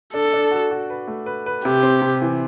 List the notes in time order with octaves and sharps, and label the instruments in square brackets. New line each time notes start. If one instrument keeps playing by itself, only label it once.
[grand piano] D4 [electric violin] A4
[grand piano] D4
F#4
F#4
B4
A3
B4
B4
[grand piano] C3 [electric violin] G4
[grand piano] C4
C3
E3